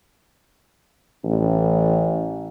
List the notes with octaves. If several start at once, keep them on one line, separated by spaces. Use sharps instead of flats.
A1